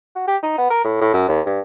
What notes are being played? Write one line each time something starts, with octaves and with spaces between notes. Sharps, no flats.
F#4
G4
D#4
B3
A#4
A2
A2
F#2
D#2
G2